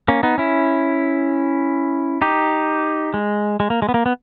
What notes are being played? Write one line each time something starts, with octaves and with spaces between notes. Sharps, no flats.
A#3 C#4
B3 D#4
C#4 E4
D#4 G4
G#3
G#3
A#3
G#3
B3
A#3
B3